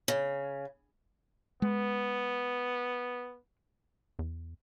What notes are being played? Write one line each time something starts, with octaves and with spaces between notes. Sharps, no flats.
C#3
G#3 B3
E2